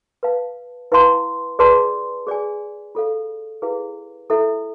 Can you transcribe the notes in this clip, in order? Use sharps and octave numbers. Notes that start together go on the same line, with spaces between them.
B4 F5 A5
E4 B4 F5 A5 C6
G#4 B4 D5 A5 C6
G#4 D5 G#5
F4 A4 D5 F5
E4 G#4 B4 F5
E4 A4 E5